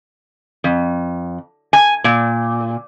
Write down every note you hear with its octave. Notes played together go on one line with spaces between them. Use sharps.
F2
G#5
A#2